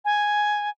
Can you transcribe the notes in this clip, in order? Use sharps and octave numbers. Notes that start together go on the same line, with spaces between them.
G#5